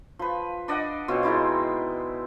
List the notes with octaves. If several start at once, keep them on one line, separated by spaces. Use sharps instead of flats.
F3 B4
D4 D5 D#5 F#5
B2 C4 F4 C#5
G#3 D#4 E4 D5